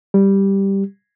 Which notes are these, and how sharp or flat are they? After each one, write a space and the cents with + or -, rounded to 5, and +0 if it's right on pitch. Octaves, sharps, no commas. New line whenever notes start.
G3 +0 G4 +0